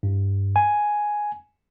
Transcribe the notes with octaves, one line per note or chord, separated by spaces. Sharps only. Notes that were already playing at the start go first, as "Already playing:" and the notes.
G2
G#5